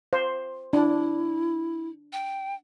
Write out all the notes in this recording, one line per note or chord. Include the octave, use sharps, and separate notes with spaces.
C5
D4 E4
G5